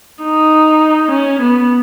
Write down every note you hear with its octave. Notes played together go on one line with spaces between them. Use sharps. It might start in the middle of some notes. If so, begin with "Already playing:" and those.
D#4
C#4
B3